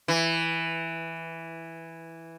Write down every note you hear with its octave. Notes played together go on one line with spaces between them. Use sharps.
E3